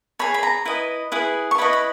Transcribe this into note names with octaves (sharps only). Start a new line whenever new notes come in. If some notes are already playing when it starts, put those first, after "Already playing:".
G#4 C#5 B5
B5
A#5
E4 B4 D#5
E4 G#4 B4
C#6
E4 B4 D#5 B5
B5